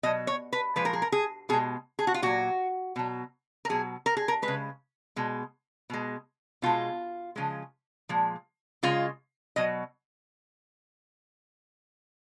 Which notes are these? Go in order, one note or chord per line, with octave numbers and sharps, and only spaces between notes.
B2 F#3 D#5
C#5
B4
A#2 F3 G#3 B4
A#4
G#4
A#4
G#4
B2 G#3 G#4
G#4
F#4
F4
A#2 F#3 F#4
B2 F#3
A#4
B2 F#3 G#4
A#4
G#4
A#4
G#3 B4
C#3
B2 G#3
B2 G#3
B2 G#3 F4
C#3 F3 G#3
A#2 F3 G#3
C#3 G#3 F4
B2 F#3 D#5